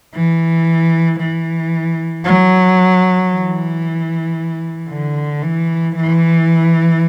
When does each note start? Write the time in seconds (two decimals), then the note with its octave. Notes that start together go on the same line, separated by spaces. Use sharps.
0.15 E3
1.20 E3
2.26 F#3
3.32 E3
4.89 D3
5.43 E3
5.96 E3